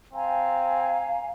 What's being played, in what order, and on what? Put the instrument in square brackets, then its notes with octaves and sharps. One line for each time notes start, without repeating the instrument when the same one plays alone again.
[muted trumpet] C4 [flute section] F5 G#5 A#5